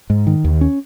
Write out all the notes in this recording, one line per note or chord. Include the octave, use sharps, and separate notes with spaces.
G#2
D#3
D#2
C#4